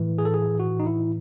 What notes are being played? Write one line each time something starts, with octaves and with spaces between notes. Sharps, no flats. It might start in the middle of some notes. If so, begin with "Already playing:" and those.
Already playing: A2 E3
G#4
A4
G#4
F#4
D#4
E4